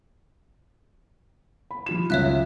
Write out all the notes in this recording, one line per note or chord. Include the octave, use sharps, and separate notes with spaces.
B5
F3 F4 E7
C#2 F#2 C#5 E5 F#6